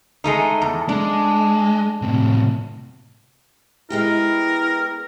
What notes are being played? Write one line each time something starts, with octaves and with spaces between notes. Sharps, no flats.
G#3 A3 D#4
E2
G#3 D4
A2 C3
G#3 B3 E4 G4 A#4